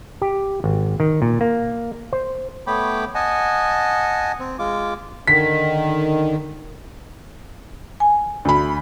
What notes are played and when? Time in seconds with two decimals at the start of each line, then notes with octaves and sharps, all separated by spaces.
0.22 G4
0.64 G#1
1.00 D#3
1.22 A#2
1.41 A#3
2.13 C5
2.67 A3 B3 C#5 G5 B5 D6
3.15 D#5 F#5 G#5 A5
4.40 C4
4.59 G#3 F4 D6
5.27 D3 D#3 B6
8.00 G#5
8.45 D2 B5